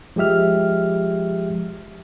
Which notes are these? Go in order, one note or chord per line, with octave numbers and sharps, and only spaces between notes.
F3 G#3 G4 E5 F6